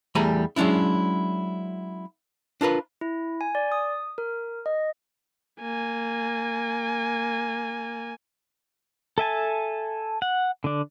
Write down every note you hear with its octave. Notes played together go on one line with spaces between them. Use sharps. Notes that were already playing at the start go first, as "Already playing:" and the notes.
E2 G3 A3 G#5 A#5 B5
F#3 G#3 C#4 D4 E4
D4 F4 A#4 B4
E4
G#5
D5
D#6
A#4
D#5
A#3 G#5
A4 E5 G#5 A5
F#5
D3 D4